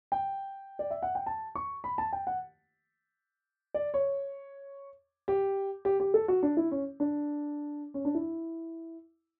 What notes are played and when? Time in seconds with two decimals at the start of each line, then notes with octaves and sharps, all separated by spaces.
0.12 G5
0.79 D5
0.91 E5
1.02 F#5
1.15 G5
1.26 A5
1.55 C#6
1.84 B5
1.98 A5
2.13 G5
2.27 F#5
3.74 D5
3.94 C#5
5.28 G4
5.85 G4
6.00 G4
6.14 A4
6.28 F#4
6.43 D4
6.57 E4
6.71 C#4
7.00 D4
7.94 C#4
8.05 D4
8.14 E4